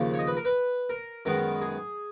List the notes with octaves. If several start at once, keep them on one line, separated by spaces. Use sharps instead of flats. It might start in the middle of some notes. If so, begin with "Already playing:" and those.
Already playing: D#2 C#3 F3 A#3
C#5
D#5
B4
A#4
B4
A#4
F#2 D#3 G#3 B3 A#4
G#4